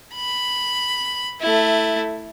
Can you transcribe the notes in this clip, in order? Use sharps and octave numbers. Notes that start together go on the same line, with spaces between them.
B5
A3 E4